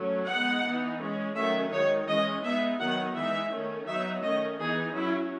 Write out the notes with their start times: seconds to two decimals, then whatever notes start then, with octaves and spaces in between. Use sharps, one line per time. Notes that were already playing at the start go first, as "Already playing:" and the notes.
Already playing: F#3 A3 C#4
0.28 G#3 B3 D#4 F#5
0.65 E3 B3 D#4
1.00 G#3 C#4
1.36 D#3 F#3 A3 C#4 E5
1.71 D#3 G#3 D#4 C#5
2.08 E3 G#3 C#4 D#5
2.43 G#3 B3 D#4 E5
2.79 D#3 F#3 B3 D#4 F#5
3.16 E3 G#3 D#4 E5
3.51 D#3 A3 C#4
3.87 F#3 B3 D#4 E5
4.23 D#3 A3 C#4 D#5
4.59 E3 B3 D#4 G#4
4.94 F#3 C#4 E4